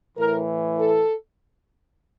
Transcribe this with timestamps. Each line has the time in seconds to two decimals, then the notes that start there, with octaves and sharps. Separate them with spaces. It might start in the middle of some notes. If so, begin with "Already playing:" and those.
0.17 A2 E3 A#4
0.78 A4